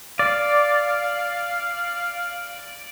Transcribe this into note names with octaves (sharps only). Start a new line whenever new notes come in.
D5 F5